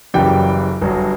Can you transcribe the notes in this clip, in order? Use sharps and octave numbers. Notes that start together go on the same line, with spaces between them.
F#1 F#2 C#3 E3 G3 G5
G1 G2 F#3